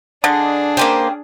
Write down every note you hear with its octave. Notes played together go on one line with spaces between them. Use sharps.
D3 D4 G#4 D#5
A#3 C#4 G4 B4 C5